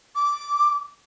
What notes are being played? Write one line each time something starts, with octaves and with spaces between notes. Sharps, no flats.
D6